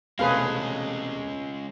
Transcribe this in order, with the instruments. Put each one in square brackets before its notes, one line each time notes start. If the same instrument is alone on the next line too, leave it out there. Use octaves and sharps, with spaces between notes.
[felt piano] E1 C3 A3 [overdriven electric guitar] G#3 C#4 [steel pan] G#4 B4 F5